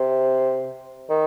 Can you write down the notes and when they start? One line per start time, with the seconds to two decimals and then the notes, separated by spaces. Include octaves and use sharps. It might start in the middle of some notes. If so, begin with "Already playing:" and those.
Already playing: C3
1.10 D#3